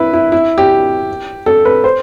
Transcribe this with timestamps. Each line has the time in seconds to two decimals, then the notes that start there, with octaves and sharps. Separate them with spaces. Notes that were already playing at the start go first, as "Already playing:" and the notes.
Already playing: E4 B4
0.13 E4
0.32 E4
0.58 G4
1.46 A4
1.65 B4
1.84 C5